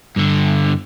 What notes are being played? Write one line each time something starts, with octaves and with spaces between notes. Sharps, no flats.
G2 D3